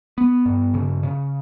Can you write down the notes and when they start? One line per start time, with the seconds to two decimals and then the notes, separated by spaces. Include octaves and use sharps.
0.18 B3
0.46 G2
0.74 C#3
1.03 C#3